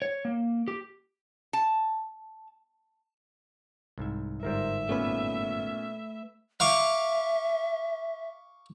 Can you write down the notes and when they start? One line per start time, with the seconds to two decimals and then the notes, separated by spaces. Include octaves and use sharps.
0.02 C#5
0.25 A#3
0.68 G4
1.53 A5
3.98 C2 G#2 E5
4.43 G1 G#2 G3 A#4 C5 E5
4.89 A#2 A3 B3 C#4 B4
6.60 E5 F5 C#6 D6